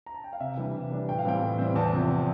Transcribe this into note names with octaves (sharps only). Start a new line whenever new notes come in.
A#5
A5
G5
F5
C3 E5
E3 G3 D4
C3
E3 G3 D4
A2 G5
F5
E3 G3 C4 G5
A2
E3 G3 C4
E2 A5
C3 F3 C4